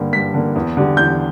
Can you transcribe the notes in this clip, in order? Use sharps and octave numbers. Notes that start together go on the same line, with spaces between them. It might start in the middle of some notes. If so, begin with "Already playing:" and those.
Already playing: G2 D3 A#3
G2 B6
D3 A#3
E2
D3 G3
E2 G6